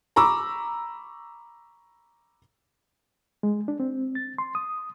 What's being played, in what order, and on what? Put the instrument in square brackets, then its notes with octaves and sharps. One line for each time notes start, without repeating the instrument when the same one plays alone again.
[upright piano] A#5 B5 C#6 D6 E6
[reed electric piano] G#3
D4
C4
A6
C6
D#6